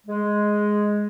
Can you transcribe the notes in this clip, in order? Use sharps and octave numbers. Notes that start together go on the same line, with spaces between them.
G#3